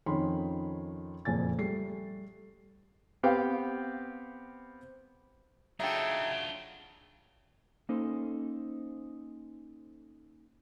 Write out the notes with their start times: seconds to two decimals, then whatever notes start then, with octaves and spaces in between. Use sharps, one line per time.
0.06 F2 D#3 C#4 C#5 B5 C6
1.25 F#1 F2 A#2 G#5 A6
1.58 G3 A3 C7
3.23 B3 C4 G4 F5 G5
5.80 C#3 F#3 D4 D#4 F4 A4 E5 G5
7.89 A#3 C#4 D#4 A4 C5